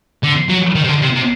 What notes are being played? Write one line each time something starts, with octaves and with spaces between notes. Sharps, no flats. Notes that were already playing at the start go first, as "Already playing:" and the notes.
D3
F#3
D#3
C3
D3
C3
C3